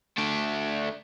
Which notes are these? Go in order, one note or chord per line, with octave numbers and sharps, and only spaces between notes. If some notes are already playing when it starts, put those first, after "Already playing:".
A3 D4